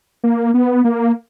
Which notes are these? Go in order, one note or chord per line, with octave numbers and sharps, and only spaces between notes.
A#3
B3
A#3